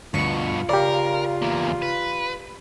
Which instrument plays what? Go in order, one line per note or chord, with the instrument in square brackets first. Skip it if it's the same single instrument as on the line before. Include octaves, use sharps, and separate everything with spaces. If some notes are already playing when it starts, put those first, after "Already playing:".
[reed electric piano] D2 [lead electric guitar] G2 B2 [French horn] F4 [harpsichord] C#6
[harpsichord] C#3 [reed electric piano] G4 D5 [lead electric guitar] A#4
[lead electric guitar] E2 A#3
B4